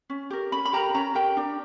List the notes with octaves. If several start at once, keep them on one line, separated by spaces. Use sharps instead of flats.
C#4
G4 A#4
C#4 B5
B5
G4 A#4 A#5
C#4 A#5
G4 A#4 G5
D4